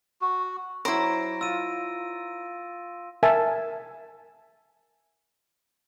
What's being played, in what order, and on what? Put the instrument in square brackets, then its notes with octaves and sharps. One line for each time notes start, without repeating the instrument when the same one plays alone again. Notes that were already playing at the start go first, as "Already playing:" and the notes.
[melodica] F#4
[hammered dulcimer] F#3 [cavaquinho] E4 C5 [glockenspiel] A#6 D7
[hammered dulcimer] F4 [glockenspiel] E6 D#7
[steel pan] A#4 E5 G#5 A5